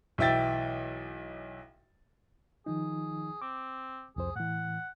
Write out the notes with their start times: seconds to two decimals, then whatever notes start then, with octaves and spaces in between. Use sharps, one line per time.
0.18 B1 E3 E5 G5 A6
2.66 D#3 F3 D#4 G#4
3.42 C4 D6
4.16 C2 F2 G#4 C5
4.36 A2 E3 F#5